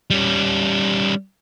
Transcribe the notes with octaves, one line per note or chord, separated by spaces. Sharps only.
G3 C#4